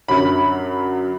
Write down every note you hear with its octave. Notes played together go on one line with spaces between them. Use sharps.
F#2 D3 F#3 C#4 B5